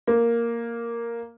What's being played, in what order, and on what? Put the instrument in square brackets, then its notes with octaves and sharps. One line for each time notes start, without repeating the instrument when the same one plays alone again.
[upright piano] A#3